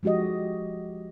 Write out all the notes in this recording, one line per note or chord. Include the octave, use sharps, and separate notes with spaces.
F3 G#3 F#4 G4 D#5